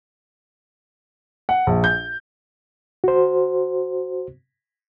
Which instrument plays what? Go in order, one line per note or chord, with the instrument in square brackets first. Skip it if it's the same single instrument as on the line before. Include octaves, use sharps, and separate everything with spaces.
[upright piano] F#5
A#1
G6
[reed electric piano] F#4 C5